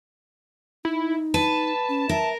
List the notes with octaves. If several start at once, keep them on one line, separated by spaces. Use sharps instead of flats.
D#4 E4
B4 A5
C#4
A#4 E5